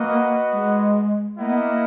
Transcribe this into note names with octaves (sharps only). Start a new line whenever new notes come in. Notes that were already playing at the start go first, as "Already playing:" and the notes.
Already playing: A#3 F#4 B4 D#5 F#5
G#3
A#3 E4 A#4 D#5 F#5
B3
A#3